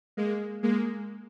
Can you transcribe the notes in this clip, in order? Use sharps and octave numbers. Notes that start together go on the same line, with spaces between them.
G#3 A#3
G#3 A#3